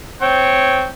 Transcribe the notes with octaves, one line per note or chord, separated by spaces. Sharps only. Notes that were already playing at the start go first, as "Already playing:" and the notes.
C4 C#5 G5